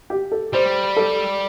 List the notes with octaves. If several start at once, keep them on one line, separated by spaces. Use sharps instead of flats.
G4
A4
G3 C5
A4